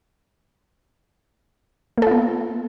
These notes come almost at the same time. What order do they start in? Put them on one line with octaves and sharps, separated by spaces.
A#3 A4 F4 B3